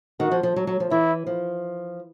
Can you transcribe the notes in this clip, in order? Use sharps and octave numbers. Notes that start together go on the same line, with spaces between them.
D#3 F#4
F3
F3
F#3
F#3
F3
E3 E4
F3